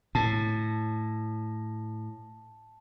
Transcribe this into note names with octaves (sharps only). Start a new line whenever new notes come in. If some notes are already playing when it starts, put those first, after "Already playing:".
A2 A5